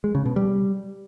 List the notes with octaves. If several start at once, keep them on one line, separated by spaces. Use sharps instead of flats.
G#3
C#3
B2
G3